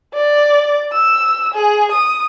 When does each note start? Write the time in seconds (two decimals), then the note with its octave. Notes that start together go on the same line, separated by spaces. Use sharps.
0.14 D5
0.93 E6
1.54 G#4
1.91 D#6